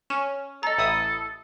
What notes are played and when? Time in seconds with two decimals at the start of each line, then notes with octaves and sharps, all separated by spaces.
0.10 C#4 E7
0.63 A4 D#5 A#5
0.78 A1 E4 D#6